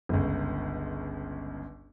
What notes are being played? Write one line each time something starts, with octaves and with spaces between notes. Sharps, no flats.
G1 C#2